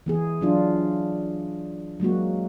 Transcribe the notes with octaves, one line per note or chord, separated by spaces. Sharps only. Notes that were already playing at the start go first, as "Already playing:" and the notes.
E3 B3 G#4
F#3 D4 F4
F#3 G#3 A#3 F#4